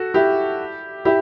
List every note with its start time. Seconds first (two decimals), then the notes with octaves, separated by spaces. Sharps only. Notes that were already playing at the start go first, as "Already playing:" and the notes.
Already playing: F#4 A4
0.14 E4 G4
1.05 E4 G4